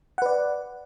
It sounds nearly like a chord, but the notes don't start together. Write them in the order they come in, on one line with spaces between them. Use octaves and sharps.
F#5 B4 D5